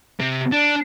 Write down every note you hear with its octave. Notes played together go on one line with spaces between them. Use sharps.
C3
D4